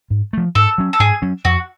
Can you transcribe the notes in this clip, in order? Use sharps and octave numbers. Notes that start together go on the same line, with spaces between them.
G#2
F3 A3
G#2 A4
F#3 C#4
A4
G#2 G#4
F#3 C#4
F2 F#4